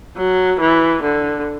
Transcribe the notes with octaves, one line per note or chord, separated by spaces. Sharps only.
F#3
E3
D3